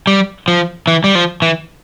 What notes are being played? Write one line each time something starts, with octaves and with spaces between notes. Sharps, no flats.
G3
F3
E3
G3
F3
E3